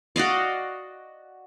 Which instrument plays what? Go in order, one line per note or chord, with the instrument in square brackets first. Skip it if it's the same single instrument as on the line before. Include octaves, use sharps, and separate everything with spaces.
[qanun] F#4 D5 D#5 F5